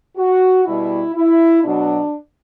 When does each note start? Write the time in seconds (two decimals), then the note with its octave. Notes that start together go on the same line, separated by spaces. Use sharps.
0.17 F#4
0.66 B2 G3 E4
1.15 E4
1.64 B2 F#3 D4